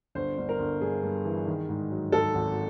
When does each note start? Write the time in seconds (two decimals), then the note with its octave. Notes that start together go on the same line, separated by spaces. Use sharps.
0.15 G1 C5
0.37 G1
0.49 A#4
0.59 G1
0.81 G2 G#4
1.03 G2
1.25 E3
1.47 D#3
1.69 G#2
1.90 F#3
2.12 G#2 A4
2.35 G#1